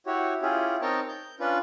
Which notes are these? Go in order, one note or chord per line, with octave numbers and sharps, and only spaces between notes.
E4 F#4 G4 C#5
C#4 E4 F4 G4 G#4
C4 D#4 A#4 C#5 G5 A5
G6
C#4 D4 F4 B4